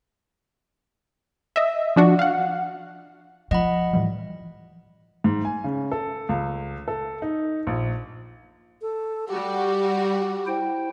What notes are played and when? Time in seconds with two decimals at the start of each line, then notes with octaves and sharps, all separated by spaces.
1.56 D#5 E5
1.96 F3 D4 F#4
2.19 F5 F#5
3.51 F3 D#5 F#5 B5
3.93 A2 E3 G3
5.24 G#2
5.45 G#5
5.64 C#3
5.91 A4
6.29 C#2
6.88 A4
7.22 D#4
7.67 A#1
8.82 A4
9.28 G3 F#4 G4
10.47 E4 C5 G5